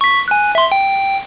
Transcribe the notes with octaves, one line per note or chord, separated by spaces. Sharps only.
C#6 B6
G#5 F#6
E5 C6
G5